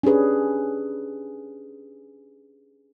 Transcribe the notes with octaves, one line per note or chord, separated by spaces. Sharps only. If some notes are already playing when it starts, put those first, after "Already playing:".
C#4 D4 G4 G#4 B4